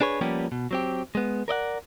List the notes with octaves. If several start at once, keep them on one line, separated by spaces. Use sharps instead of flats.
D4 G#4 B4 C#5
F3 G3 A#3 B3 C#4 G4
B2
F#3 C4 G4
G#3 B3
A#4 D5 D#5 F#5